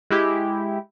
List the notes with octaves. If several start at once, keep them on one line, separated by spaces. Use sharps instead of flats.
G#3 E4 G4